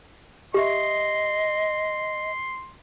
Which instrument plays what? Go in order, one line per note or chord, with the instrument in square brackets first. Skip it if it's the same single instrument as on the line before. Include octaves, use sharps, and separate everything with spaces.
[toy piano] G4 E5 [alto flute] D#5 [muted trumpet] C6